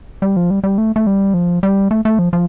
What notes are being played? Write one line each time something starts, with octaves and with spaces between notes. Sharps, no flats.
G3
F3
G3
G3
A3
A3
G3
F3
G3
A3
A3
F3
F3